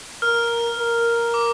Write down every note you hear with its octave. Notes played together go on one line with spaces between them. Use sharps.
A#4 F6
A#4
D6